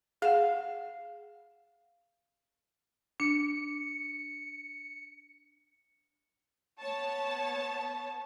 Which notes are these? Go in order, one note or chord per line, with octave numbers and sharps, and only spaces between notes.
G#4 F5 F#5
D4 C#7
B3 C#5 A5